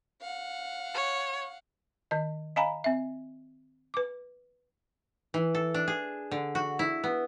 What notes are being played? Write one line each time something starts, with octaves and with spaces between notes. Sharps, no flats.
F5 F#5
C#5
D#3 D#5
D#5 F5 G#5 A#5 B5
C4 E5
B4 D6
E3
A4
D4
G#4
D3
F#4
E4
B3